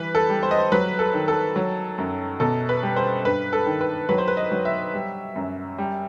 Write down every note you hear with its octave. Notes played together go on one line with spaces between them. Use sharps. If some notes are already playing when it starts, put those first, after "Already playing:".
Already playing: E3 G3 B4
A4
G3
C5
D#5
C5
F#3 B4
A4
D#3
A4
F#3
F#2
B2 A4
B4
G3
C5
G2 B4
A4
D#3
B4
F#3 B4
C5
B4
D#5
F#3
E5
G3
F#2
G3